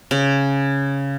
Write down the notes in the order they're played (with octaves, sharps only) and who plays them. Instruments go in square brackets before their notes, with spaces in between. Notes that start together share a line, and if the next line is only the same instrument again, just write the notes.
[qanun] C#3